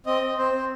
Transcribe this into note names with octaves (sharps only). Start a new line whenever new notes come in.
C4 D#5
C4
C4 C5
C4